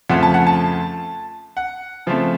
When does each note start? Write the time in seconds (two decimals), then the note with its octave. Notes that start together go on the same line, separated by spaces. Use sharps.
0.09 F2 C#3 F3 A3 C4 F#5
0.23 A5
0.34 F#5
0.47 A5
1.57 F#5
2.06 C#3 F3 A3 C4